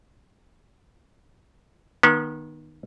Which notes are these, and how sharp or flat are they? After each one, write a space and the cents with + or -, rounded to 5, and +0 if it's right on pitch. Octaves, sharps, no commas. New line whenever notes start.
D#3 -15 B3 -40